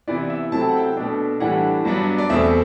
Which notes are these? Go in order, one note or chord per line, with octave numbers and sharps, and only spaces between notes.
C3 E3 B3 E4 D5
E5
C3 F#3 A3 C4 E4 A5
G5
F#5
G5
B2 A3 D4
A2 E3 G3 D4 F#5
G2 F#3 B3 D4
D5
E2 B2 A3 C4 E5